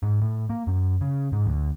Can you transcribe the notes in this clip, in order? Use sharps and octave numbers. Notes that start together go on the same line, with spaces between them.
G#2
A2
A#3
F#2
C#3
G#2
D2